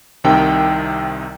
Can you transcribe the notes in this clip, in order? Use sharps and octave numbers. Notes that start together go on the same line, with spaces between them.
C2 C3 D#3 G5